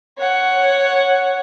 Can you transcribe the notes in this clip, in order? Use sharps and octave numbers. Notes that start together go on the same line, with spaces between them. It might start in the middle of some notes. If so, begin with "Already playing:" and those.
C#5 F#5